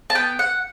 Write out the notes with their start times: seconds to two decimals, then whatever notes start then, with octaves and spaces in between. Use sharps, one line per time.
0.10 A5
0.15 B3 G5
0.39 F#5